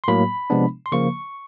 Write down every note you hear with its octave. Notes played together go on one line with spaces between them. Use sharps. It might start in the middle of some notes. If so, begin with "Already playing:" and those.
C6
A2 F#3 A#3 B5
C3 F3 G#3 B3 D4
C6
C#3 F3 A#3 C#6